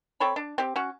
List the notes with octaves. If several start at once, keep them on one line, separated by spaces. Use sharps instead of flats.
C4 A4 C#5 B5
D4
C4 G4
C#4 F#4